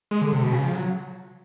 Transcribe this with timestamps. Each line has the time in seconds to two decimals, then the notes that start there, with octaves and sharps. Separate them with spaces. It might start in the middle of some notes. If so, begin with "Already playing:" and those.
0.11 G#3
0.22 D3
0.33 C3
0.43 B2
0.53 C#3
0.64 F3
0.74 F#3